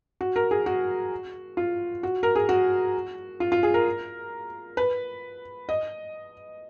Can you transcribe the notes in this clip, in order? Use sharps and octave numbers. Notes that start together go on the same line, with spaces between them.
F#4
A#4
G#4
F#4
F4
F#4
A#4
G#4
F#4
F4
F4
G#4
A#4
B4
D#5